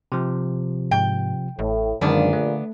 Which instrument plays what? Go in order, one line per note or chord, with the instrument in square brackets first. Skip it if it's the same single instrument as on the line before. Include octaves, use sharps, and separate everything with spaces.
[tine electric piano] C3 F3
[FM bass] G#2 [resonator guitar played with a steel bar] G5
[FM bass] A1 [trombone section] A2
[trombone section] A#1 A#2 [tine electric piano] F#2 D#3 G#3 [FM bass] D3 [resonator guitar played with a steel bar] B3 D4
[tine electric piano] A3